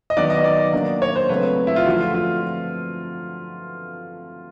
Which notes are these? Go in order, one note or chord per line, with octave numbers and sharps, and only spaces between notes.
D#5
D#3 F#3 B3 D#4 D5
D#5
D5
F#3 A#3 D4
C#5
C5
C#3 F#3 A3 C4 B4
E4
F4
D3 F3 A3 D4 F#4
F4
F4